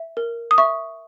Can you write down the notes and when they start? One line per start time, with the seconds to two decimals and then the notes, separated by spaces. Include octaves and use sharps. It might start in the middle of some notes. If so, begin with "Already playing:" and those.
Already playing: E5
0.17 A#4
0.51 D#6
0.58 E5 C#6